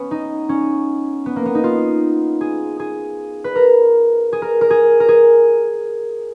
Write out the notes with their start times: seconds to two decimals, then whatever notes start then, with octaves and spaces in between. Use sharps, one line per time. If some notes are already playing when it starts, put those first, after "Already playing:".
Already playing: B3 C#4
0.11 D#4
0.49 C#4
1.26 B3
1.36 A#3
1.46 B3
1.55 D#4
1.64 F4
2.41 G#4
2.80 G#4
3.44 B4
3.56 A#4
4.33 G#4
4.42 A#4
4.61 A#4
4.70 G#4
5.00 A#4
5.09 G#4